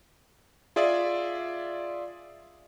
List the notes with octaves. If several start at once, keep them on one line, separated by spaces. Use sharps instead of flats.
F4 G#4 D5 E5